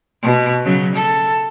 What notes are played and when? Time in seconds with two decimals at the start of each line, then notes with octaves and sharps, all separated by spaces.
0.23 B2
0.65 C#3 F#3
0.95 A4